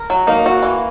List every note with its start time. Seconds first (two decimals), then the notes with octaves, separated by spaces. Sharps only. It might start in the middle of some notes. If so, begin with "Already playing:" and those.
Already playing: A#4
0.10 F#3
0.27 A#3 D#4
0.46 F#4
0.62 E3